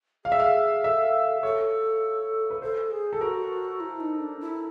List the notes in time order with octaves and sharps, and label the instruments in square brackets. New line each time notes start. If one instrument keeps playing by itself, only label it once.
[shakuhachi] G#4 [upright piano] F5
[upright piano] E5
F5
[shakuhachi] A4 [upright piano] E5
[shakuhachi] G#4
[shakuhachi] A4 [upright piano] C#5
[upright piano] B4
[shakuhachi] A4 [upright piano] C5
[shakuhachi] G#4
[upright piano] A4
[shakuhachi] F#4 [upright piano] A#4
[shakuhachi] E4
D#4
D4
E4